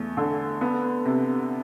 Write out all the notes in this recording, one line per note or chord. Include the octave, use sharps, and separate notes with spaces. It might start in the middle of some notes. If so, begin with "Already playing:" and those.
Already playing: E2 A3
D3
B3
C3